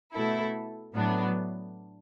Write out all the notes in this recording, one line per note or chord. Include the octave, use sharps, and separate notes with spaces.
B2 A3 E4 A4
A2 F#3 B3 D4